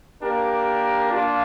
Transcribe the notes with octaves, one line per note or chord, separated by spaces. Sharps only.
A#3 D4 G4 A#4
A#3 D4 F4